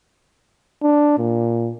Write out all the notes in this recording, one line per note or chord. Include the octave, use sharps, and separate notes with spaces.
D4
A#2